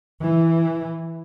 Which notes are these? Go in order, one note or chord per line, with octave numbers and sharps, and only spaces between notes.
E3